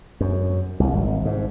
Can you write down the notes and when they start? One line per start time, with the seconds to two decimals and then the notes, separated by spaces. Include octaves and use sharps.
0.21 F#2
0.80 C2
0.93 G#1
1.25 G#2